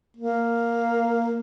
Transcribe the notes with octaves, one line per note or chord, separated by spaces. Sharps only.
A#3